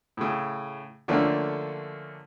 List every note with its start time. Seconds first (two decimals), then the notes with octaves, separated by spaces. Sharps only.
0.17 A2 C#3
1.08 D3 F3 A3 A#3 C#4 D4